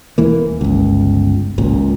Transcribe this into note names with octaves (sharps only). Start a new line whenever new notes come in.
D#1 E3 A#3
G1 C#2
G#1 C#2 A#2